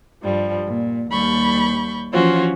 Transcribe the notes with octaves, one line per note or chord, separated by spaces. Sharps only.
G2 F3 G3
A#2
D#2 G3 B5 C#6 G6
E3 F3 C#4 F4 F#4 C5